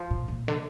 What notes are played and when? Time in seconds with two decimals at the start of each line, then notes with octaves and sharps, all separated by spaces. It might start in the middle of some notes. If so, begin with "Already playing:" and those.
Already playing: F3
0.11 A#2
0.28 A#2
0.48 D3